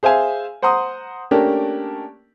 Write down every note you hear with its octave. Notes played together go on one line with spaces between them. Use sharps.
G#4 C5 E5 F5 G#5
C5 F#5 A#5 C6 D#6
A3 A#3 C#4 D4 G4 A#4